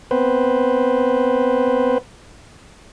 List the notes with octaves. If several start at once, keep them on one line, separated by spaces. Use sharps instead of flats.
B3 C4 B4 C5